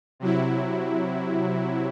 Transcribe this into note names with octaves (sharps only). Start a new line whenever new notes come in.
C3 F#3 E4